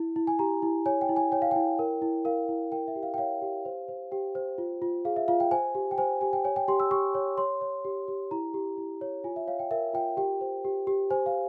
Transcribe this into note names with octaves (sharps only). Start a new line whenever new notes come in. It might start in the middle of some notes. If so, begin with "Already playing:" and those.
Already playing: E4
E4
G#5
G4 A#5
E4
C#5 G#5
G5
E4
G#5
C#5 G5
F5
E4 G5
A#4
E4
A#4 F5
E4
A#4 G5
E5
G4
F5
G5
C#5 F5
G4
C5
C5
G4 G5
C5
F4
F4
G#4 F5
E5
F4 F5
G5
C5 G#5
G4
G5
C5 G#5
G4 G#5
G5
C#5 G#5
G5
G4 C6
E6
G4 C#6
C#5
C#5 C6
C#5
G4
G4
E4 A#5
G4
E4
C#5
F4 G#5
E5
C#5 F5
G5
A#4 E5
F4 G5
G4 G5
C5
G4
G4
C5 G#5
F5